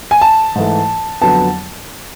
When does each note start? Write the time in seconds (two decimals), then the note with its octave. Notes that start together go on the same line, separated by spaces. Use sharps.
0.11 G#5
0.21 A5
0.55 G#2 E3 A3
1.21 F2 D3 F#3 B3 A5